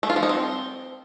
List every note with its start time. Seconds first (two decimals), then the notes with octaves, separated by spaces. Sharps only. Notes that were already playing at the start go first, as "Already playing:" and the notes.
0.03 A3
0.10 F4
0.16 F3
0.23 D#4
0.29 C4